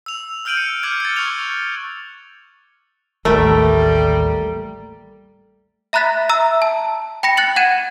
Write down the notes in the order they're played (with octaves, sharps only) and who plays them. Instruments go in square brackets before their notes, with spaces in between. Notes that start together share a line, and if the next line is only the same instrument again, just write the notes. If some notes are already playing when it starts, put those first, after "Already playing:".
[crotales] E6 F7
E6 F6 G6 D7 D#7 F#7
C#7 D#7
D6 F6 F#6 G#6 F#7
A6 C#7
C#6 F#6 G#6 C#7 F7 G7
[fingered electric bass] A1 D#2 [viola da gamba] G3 [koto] A3 [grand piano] A#4
[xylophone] E5 A#5 B5 F#6 A6 B6
E5 A#5 E6
A5
G5 B5 A#6 C#7
F#6 A6 C#7 F#7
F#5 G#6 D#7 E7